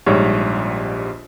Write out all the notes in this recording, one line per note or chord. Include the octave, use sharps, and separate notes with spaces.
A#1 G#2 G3 C#5